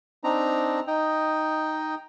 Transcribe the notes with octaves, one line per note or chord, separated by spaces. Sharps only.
C4 D4 D#4 A#5
D#4 D#5 G5